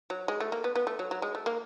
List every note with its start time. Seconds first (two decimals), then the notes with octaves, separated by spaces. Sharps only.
0.10 F#3
0.28 G#3
0.40 A3
0.52 A#3
0.64 B3
0.75 B3
0.87 A3
0.99 F#3
1.11 F#3
1.22 G#3
1.35 A3
1.46 A#3